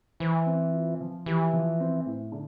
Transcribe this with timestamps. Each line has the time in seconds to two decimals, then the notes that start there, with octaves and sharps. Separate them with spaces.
0.20 E3 C5
0.46 C4
0.73 F4
1.00 F3
1.26 E3 G4
1.53 F3
1.80 C4
2.06 A2
2.32 D3